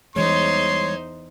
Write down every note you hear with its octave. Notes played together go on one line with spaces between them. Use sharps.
E2 E3 G3 G#3 D#4 C5 C#5 C6